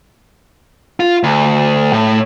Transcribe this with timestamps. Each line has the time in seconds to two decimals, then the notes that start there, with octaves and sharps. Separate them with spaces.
1.00 F4
1.23 D2
1.93 A2